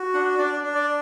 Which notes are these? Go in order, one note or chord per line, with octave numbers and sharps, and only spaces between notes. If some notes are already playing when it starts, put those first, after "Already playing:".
Already playing: F#4
D4 F#5
D4 D5
D4
D5